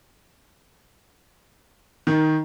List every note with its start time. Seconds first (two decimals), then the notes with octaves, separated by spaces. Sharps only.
2.07 D#3